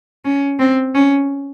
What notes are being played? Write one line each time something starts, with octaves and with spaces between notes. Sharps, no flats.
C#4
C4
C#4